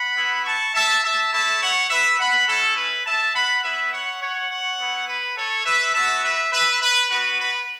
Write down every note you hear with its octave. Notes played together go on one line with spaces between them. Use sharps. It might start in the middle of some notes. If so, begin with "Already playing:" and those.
Already playing: F#5 B5
B3 E4
A5 C#6
E5 A5
E5 A5
A3 E4 E5 A5
C#5 F#5
B4 E5
F#5 B5
A3 C#4 E4 A4
B4
E5 A5
F#5 B5
B3 E4 B4 E5
C#5 F#5
C#5 F#5
C#5 F#5
B3 E4
B4
A4 C#5
B4 E5
B3 F#4 E5 A5
B4 E5
B4 E5
B4
B3 F#4 B4
B4